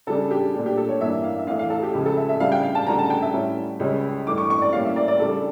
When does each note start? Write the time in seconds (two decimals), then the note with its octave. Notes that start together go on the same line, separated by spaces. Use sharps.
0.07 C#3 G3 D4 A4
0.31 G4
0.55 A#2 A3 D4
0.66 G4
0.77 A4
0.89 C#5
1.00 G2 E3 A#3 D4 E5
1.24 F5
1.39 E5
1.47 E2 E3 A3 F5
1.59 F5
1.70 A4
1.83 G4
1.93 C#2 C#3 F3 G4
2.06 A4
2.17 E5
2.29 E5
2.40 C#3 G3 D4 F5
2.52 G5
2.63 F5
2.75 A5
2.87 D2 C#3 G3 A#5
2.99 A5
3.10 G5
3.22 E5
3.33 A2 G3 C#4
3.80 C#2 C#3 G3 C#4
4.27 G2 E3 A3 D6
4.38 C#6
4.50 C#6
4.62 D5
4.73 A2 G3 A#3 C#4 F5
4.85 E5
4.96 D5
5.08 D5
5.20 C#3 G3 D4 A4